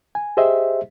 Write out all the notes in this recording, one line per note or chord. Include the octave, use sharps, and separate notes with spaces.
G#5
G4 G#4 C5 D#5 E5